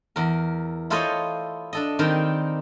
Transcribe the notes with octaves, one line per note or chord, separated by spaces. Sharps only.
E2 A#4
E4 F4 A4 C5 C#5 D#5
D4 A4 D#5
D#3 G3 C4 D#4 G4 A#4